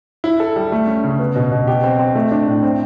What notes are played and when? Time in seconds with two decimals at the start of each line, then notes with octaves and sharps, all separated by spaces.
0.24 E4
0.40 A4
0.56 G3
0.72 A3
0.87 C#4
1.04 C#3
1.20 B3
1.36 B2
1.52 B2
1.67 G4
1.84 C4
1.99 C4
2.15 A3
2.31 D4
2.47 A2
2.63 C4